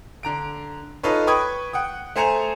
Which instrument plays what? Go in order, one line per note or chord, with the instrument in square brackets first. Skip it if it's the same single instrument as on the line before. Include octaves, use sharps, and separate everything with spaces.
[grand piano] D3 A#5 D7
D#4 F4 A4 B4 C#5
B4 G5 B5 C#6 D#6 G#6
F#5 G5 D#6
A3 C5 G#5 A#5 C#7 F7